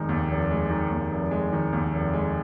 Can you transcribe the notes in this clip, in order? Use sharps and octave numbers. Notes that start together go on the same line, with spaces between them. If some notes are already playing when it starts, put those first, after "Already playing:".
Already playing: F1 D#3 G#3
D#2
F1
G#3
D#3
D#2
F1
G#3
D#3
D#2
F1
G#3